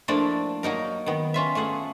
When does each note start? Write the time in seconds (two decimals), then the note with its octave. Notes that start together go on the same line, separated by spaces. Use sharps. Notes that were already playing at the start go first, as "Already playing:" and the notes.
0.08 F3 A3 A#3 D4 E4 D5
0.63 F#3 A#3 D#4 A#4
1.06 D#3 B3
1.34 C#4 F4 E5
1.55 A3 F4 G#4 F#5